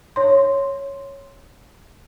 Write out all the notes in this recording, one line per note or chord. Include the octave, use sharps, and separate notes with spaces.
C#5 C6